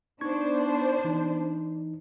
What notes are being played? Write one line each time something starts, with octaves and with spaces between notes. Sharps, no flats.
B3 D4 D#4 C5 C#6 G#6
E3 D#4